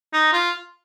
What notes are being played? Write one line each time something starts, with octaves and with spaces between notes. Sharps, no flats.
D#4
F4